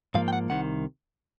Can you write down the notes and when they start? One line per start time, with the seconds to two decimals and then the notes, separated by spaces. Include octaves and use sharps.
0.14 G#2 F3 A#3 F5
0.28 G5
0.33 F#5
0.50 C2 C3 D#3 F#5